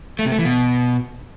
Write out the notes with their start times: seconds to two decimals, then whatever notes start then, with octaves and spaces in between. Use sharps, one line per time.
0.19 A3
0.25 C3
0.32 A3
0.39 E3
0.45 B2